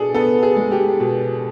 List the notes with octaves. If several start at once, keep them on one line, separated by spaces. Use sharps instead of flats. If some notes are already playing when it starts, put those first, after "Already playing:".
Already playing: B2 D4 G#4 A4
B3 A4
G#4
G#3
G4
B2